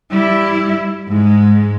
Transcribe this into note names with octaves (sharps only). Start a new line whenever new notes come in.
G3 E4
G#2 G#3